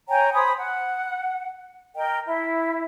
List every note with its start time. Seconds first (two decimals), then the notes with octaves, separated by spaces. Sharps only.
0.09 C#5 G5 G#5 A#5
0.33 C5 G#5 B5 D#6
0.57 F#5
1.95 A#4 D#5 G5
2.26 E4